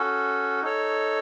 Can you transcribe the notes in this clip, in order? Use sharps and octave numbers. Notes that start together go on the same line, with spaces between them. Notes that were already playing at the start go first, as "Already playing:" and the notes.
Already playing: C#4 F#4 A4
D#4 A4 C#5